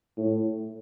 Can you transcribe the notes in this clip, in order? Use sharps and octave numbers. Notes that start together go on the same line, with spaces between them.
A2